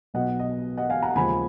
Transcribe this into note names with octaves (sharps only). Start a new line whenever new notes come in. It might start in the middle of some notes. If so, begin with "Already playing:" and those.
B1 B2 F#3 D#5 F#5
D#5
D#5 F#5
F5 G#5
F#5 A#5
D#2 C#3 F3 G#3 G#5 B5